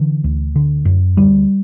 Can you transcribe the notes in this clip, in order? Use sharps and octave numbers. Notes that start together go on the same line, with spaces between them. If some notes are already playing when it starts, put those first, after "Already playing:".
Already playing: D3 E3
D2
D3
F#2
D2 G3